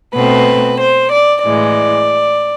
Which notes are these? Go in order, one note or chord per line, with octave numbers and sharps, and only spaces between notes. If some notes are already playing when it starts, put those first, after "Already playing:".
B2 A3 C4 B4
C5
D5
A2 E3 G#3 D5